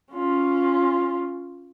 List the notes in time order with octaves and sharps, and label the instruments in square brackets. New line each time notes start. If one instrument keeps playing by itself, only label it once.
[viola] C#4 F4